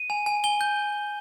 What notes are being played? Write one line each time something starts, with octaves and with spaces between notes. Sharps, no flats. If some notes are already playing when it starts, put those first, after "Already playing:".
Already playing: D#7
G#5
G#5
G#5 G7
G6